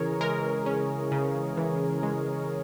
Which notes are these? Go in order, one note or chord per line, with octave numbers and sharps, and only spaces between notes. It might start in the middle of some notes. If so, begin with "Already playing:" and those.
Already playing: C#3 E3 G#4 A#4 C#5
G#3 A#4
C#4
C#3
E3
G#3